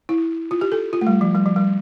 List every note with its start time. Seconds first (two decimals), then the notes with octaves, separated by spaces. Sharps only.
0.09 E4
0.51 F4
0.61 G4
0.72 A4
0.93 F4
1.01 A3
1.07 G3
1.21 F3
1.35 G3
1.46 F3
1.56 G3